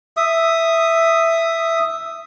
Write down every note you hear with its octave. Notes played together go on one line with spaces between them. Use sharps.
E5 D#6